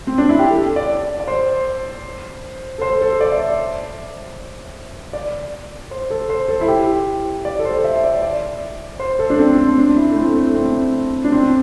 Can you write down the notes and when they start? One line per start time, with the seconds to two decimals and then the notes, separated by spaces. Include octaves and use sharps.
0.07 C4
0.18 D4
0.29 E4
0.39 G4
0.50 A4
0.76 D5
1.20 D5
1.27 C5
2.78 A4
2.82 C5
3.01 A4
3.21 D5
3.31 E5
3.40 D5
5.13 D5
5.91 C5
6.10 A4
6.29 C5
6.48 A4
6.61 E4
6.68 G4
7.45 D5
7.59 A4
7.65 C5
7.84 E5
8.04 D5
8.22 D5
9.00 C5
9.19 A4
9.30 D4
9.39 C4
9.58 C4
9.78 D4
9.96 E4
10.12 A3
10.16 C4
10.35 A3
10.54 C4
11.24 D4
11.32 C4